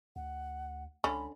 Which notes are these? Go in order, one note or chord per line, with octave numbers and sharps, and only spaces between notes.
D2 F#5
C#2 D3 C#4 B5